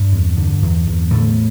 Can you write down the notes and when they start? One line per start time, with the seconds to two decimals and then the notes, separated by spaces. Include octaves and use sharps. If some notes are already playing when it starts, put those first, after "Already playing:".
Already playing: G2 G3
0.12 E2
0.37 D3
0.62 E2
0.87 E2
1.11 A2 D3 A3